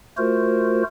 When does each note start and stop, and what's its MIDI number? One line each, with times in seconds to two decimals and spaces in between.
0.17 0.83 57
0.17 0.83 65
0.17 0.83 66
0.17 0.83 70
0.17 0.83 72